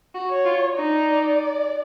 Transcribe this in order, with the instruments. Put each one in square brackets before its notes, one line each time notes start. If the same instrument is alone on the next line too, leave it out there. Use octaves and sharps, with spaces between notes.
[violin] F#4
[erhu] C#5
[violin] F4
[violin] D#4 [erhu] D5